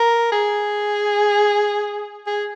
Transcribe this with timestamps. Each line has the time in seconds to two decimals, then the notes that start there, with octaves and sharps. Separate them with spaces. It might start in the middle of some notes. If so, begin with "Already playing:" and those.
Already playing: A#4
0.32 G#4
2.27 G#4